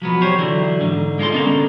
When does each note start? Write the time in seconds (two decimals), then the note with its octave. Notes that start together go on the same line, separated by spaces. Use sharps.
0.02 F3 F#3 B3
0.22 G4 C5 C#5
0.38 D3 E3 F#3 D4
0.81 G#2 D3
1.19 G#3 F4 A4 C6
1.32 D3 B3 C#4 A4 A#4